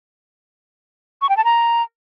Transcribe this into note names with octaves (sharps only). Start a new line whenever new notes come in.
C#6
G5
A5
A#5